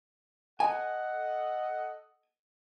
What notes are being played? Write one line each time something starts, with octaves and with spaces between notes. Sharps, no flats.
A4 D#5 F#5 G#5